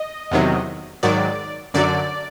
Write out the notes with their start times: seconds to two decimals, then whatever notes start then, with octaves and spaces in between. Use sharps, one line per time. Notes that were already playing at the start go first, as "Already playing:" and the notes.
Already playing: D#5
0.31 E2 C3 D#3 F#3
1.03 G#2 D#3 F#3 D5
1.74 F#2 D3 F#3 D5